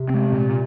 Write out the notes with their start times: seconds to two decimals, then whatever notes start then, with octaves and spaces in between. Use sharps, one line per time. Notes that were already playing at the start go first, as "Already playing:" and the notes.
Already playing: C3
0.09 G#3 C4
0.32 A#2